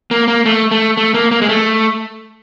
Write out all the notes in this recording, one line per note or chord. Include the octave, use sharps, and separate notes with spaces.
A#3
A#3
A3
A3
A3
A#3
A#3
G#3
A3